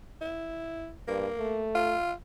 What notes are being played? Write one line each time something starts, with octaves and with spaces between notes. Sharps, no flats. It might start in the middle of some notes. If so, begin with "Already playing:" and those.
E4
G2 A#3
A3
F4